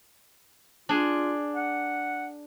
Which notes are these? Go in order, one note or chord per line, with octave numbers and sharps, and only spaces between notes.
D4 F4 G#4
F#5